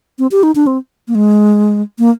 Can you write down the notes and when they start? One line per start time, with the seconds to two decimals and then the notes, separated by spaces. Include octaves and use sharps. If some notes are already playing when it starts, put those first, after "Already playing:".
0.19 C4
0.31 G4
0.43 D#4
0.55 D4
0.67 C4
1.08 A#3
1.15 G#3
1.99 A#3